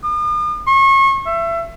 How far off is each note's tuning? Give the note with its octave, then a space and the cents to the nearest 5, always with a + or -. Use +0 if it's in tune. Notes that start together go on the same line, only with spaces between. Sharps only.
D#6 -45
C#6 -35
E5 +30